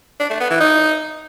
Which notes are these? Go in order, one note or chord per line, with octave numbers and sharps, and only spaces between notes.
D4
A3
B3
E3
D#4